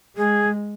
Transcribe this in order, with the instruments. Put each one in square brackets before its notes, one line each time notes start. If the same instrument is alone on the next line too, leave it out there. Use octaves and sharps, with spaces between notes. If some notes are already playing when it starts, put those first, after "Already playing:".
[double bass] G#3 [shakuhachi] G#4